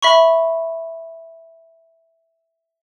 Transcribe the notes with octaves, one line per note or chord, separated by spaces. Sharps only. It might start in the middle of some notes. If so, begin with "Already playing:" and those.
E5 B5 C#6